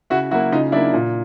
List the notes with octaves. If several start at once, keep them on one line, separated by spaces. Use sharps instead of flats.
C#3 E4 F#4
F#3 A#3 E4 F#4
C#3 D#4 F4
F#3 A#3 D4 E4
A#2